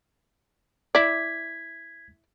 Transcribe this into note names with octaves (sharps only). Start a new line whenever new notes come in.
E4 D5 G#6 B6